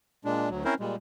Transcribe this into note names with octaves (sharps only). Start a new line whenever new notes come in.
A#2 G#3 D4
D2 F#3
C4 C#4 E4 A#4 C5
A#2 G3 G#3